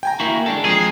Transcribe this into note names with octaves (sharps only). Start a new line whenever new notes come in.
G5 G#5 A#5
A#3 E4 F#4
G#3 D4 A4
F3 G#3 C4 G#4